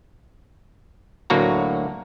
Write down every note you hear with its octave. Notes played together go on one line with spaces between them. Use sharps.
D2 A2 F#3 A#3 F#4 A#5